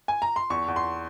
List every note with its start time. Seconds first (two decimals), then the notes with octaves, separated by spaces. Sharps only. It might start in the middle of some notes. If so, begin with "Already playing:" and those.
0.08 G#5
0.22 A#5
0.36 C6
0.50 E2 C#6
0.68 E2
0.76 C6